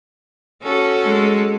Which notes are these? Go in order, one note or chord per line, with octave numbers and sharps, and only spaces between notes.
C#4 F#4 A4
G#3